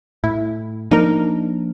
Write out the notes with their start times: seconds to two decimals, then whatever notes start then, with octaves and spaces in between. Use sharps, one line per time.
0.24 A2 E4
0.91 F3 A#3 D4 D#4 A#4